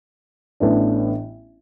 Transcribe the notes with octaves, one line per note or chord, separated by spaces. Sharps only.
A1 A2 E3 B3 D4